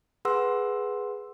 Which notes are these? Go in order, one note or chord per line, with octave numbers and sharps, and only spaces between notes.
G#4 B4 F#5 C6 E6